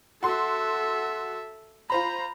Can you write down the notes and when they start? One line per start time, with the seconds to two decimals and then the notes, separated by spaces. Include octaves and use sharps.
0.23 F#4 A4 E5 C6
1.90 F4 C5 A#5 B5